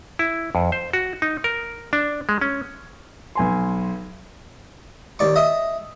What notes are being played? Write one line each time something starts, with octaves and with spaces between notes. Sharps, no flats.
E4
F2
C5
F#4
D#4
A#4
D4
G#3
C#4
B1 G#5 C6
D#2 D5 C#6
D#5 E5